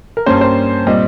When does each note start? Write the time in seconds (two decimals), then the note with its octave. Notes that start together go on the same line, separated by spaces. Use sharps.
0.17 A#4
0.26 G2 G3 A#3 C#4 C5
0.41 C5
0.87 A#2 G3 C4 D#5